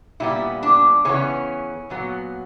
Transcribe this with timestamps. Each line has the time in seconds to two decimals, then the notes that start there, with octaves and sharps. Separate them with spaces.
0.20 A#2 G3 B3 E4
0.63 D4
1.05 C#3 E3 B3 C#4
1.90 A#2 F#3 B3